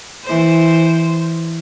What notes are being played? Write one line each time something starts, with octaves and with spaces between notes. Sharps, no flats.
E3 C5